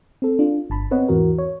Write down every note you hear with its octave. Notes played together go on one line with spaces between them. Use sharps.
C4 A4
D4 F4
G1 A5 B5
B3 C4 B4 C#5 D#5 F#5
E2 G#2 E3 F#4 A#4
C#5